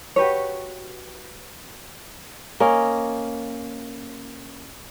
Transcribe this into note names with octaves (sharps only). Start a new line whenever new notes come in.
F#4 G4 B4 C#5
A#3 C#4 D#5